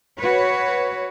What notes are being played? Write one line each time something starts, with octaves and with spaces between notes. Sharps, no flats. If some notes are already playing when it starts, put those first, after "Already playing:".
F#4 B4 C#5